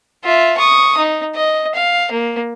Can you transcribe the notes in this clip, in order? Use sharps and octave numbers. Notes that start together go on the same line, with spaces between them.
F4 E5
C#6 D#6
D#4
D#5
F5
A#3